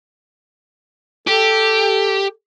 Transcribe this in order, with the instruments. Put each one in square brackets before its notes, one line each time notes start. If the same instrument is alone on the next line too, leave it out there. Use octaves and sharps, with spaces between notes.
[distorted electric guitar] G4 [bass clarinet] A4